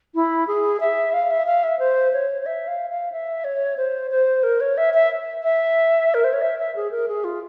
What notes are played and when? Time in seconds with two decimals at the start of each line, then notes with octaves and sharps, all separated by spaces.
0.15 E4
0.47 G#4
0.80 E5
1.13 F5
1.30 E5
1.46 F5
1.63 E5
1.79 C5
2.13 C#5
2.42 C#5
2.46 E5
2.68 F5
2.90 F5
3.12 E5
3.44 C#5
3.77 C5
4.11 C5
4.43 A#4
4.60 C#5
4.77 E5
4.94 E5
5.43 E5
6.14 A#4
6.24 C5
6.33 C#5
6.42 E5
6.59 E5
6.76 G#4
6.91 A#4
7.08 G#4
7.24 F4